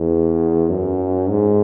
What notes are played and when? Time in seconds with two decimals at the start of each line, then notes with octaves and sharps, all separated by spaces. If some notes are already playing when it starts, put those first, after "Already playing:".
Already playing: E2
0.70 F#2
1.30 G#2